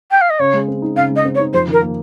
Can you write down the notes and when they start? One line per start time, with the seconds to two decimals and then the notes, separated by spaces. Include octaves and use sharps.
0.11 G5
0.21 F5
0.30 D#5
0.39 C#3 C#5
0.54 G#3
0.68 C4
0.82 D#4
0.96 C#3 F5
1.11 G#3
1.16 D#5
1.25 C4
1.35 C#5
1.39 D#4
1.53 F2 C5
1.68 D#3 A#4
1.82 A#3